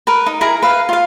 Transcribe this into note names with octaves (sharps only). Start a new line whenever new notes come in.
A#4 B4
D#4
E4 G#4 A#4 A#5
B4 F5
F4 F5